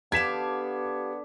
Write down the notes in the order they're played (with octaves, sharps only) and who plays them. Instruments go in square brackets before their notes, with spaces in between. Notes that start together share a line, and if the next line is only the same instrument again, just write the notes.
[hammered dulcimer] D3 D4 [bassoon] B3 [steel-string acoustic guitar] G4 F5 [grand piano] G#6 B6 E7